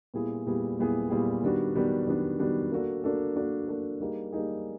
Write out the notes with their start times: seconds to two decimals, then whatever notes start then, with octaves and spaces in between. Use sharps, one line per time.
0.14 A#2 G3 B3 E4 G#4
0.46 A#2 G3 B3 E4 G#4
0.79 A#2 G3 B3 E4 G#4
1.10 A#2 G3 B3 E4 G#4
1.43 D#3 G3 B3 D4 F#4
1.75 D#3 G3 B3 D4 F#4
2.07 D#3 G3 B3 D4 F#4
2.39 D#3 G3 B3 D4 F#4
2.72 A#3 D4 F#4 A4
3.04 A#3 D4 F#4 A4
3.36 A#3 D4 F#4 A4
3.68 A#3 D4 F#4 A4
4.00 G3 A#3 D#4 G#4
4.33 G3 A#3 D#4 G#4